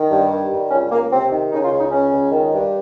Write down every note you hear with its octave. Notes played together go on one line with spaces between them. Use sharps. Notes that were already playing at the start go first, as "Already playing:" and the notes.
Already playing: D#3
G2
D#3
G2
C#2 C#4
C#2 A#3
C3 C4
D#3
C#3 D#4
F4
C#2
D#4
C#3 C#4
C#2
D#3
G2